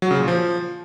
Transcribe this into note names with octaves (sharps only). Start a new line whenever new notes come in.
F#3
C#3
A#2
F3